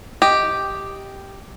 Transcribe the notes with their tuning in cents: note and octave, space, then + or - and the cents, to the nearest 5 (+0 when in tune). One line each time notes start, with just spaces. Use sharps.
G4 +0 D#5 +0